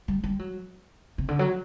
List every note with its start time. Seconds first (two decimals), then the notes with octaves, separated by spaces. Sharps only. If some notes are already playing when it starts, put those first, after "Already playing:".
0.08 G3
0.24 G3
0.39 F#3
1.18 C3
1.28 D3
1.39 F#3